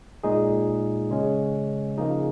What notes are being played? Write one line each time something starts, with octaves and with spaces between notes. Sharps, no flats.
A#2 G#3 D#4 G#4
C#3 G#3 C#4
C#3 F3 A#3 D#4 G#4